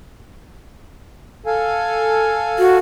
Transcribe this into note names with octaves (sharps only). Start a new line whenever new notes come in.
A4 F5 G#5
F#4